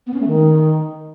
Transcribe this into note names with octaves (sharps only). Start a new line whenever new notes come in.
B3
C#4
A3
D#3